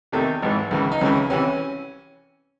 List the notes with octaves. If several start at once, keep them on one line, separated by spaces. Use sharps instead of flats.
E2 C3 D#3 A3
G#1 G#2 E3
C#2 C#3 E3
D#4
C#2 C#3 E3 C#4
C2 C3 E3 C#4